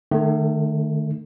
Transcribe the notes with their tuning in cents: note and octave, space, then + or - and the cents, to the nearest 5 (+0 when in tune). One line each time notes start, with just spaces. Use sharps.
D#3 -35 A3 +0